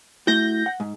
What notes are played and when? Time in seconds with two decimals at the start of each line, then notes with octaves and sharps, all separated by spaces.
0.27 A3 E4 F#4 G6 A#6
0.66 F#5
0.80 G#2